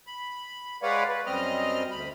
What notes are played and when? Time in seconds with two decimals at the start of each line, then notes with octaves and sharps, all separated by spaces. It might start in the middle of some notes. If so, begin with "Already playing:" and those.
0.07 B5
0.82 G#3 B4 C#5 D5 F5 F#5
1.08 B4
1.26 F#2 G3 C4 D#5 F6
1.91 D2 B5